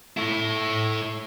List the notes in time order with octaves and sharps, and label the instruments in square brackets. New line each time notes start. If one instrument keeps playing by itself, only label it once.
[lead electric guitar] A3 E4